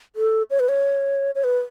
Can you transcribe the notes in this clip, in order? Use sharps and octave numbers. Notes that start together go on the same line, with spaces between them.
A4
C#5
B4
C#5
C#5
B4